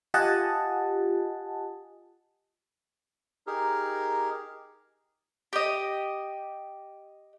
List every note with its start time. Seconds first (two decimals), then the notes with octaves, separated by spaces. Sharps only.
0.14 F4 G4 D#5 F#5 G#5 A5
3.47 D#4 G4 G#4 A#4
5.53 G4 D#5